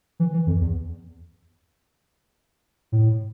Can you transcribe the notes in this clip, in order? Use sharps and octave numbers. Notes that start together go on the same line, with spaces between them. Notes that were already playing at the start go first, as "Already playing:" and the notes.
E3
E3
F2
E2
A2